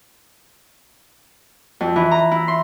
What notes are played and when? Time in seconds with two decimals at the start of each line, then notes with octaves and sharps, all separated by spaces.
1.81 F2
1.96 E3
2.11 A#5
2.31 E4
2.48 C6